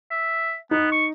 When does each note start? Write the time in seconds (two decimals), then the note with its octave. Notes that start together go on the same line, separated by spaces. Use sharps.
0.11 E5
0.71 B3 D#4
0.92 C#6